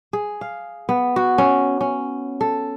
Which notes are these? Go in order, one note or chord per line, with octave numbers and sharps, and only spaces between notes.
G#4
F5
B3
F#4
C#4
C#4
A4